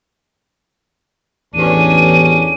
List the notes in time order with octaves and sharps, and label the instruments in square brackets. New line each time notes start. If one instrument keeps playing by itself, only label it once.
[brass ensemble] A1 E2 [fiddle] C#4 D4 [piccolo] D#7